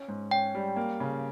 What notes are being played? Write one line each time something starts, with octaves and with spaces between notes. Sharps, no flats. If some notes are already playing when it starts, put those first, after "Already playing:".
Already playing: C#4
G#2
C#4 G5
G3
A#3
C#3